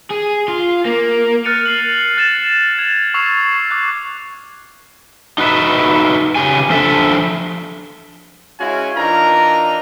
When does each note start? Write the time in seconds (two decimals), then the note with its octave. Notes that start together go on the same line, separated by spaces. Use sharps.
0.11 G#4
0.48 F4
0.86 A#3
1.44 F6 F#6 A6 C#7 D#7 F7
1.66 C7 C#7 F7 F#7
2.17 F#6 A6 E7
2.79 G#6 F7 F#7
3.14 C#6 E6 C7 F7
3.71 D6 F#6
5.38 D#4 F#4 B4 E5
6.35 C#3 G4 G#5
6.70 F3 D4 A4 E5
8.59 G#3 C#4 E4 F#4 F5 G#5
8.96 E3 D4 D#4 F4 A#4 A#5